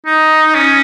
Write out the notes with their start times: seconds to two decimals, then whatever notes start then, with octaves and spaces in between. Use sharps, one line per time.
0.06 D#4
0.55 C#4